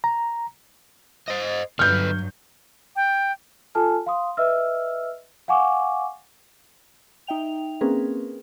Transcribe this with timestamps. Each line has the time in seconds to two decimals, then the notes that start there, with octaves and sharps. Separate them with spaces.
0.04 A#5
1.28 C5 D#5
1.79 G2 D3 F#3 B4 F6 G6
2.96 G5
3.75 F4 A4 G#5 A5 F6
4.06 F5 C6 D#6
4.37 B4 D#5 E5 E6 F6
5.48 F5 F#5 G#5 C#6 D6
7.27 D#4 E5 G5 F7
7.81 A#3 C4 C#4 G#4 A#4 B4